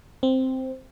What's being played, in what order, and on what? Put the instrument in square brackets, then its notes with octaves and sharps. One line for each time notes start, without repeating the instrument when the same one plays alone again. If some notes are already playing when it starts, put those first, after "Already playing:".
[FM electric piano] C4